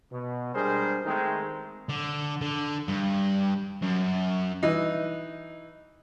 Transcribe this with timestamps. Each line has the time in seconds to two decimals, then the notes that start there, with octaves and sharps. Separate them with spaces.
0.12 B2
0.55 G3 G#3 D4 G#4 A#4 C5
1.06 D#3 G#3 A3 C4 D#4
1.89 D3
2.41 D3
2.88 G2
3.82 F#2
4.63 E3 D#4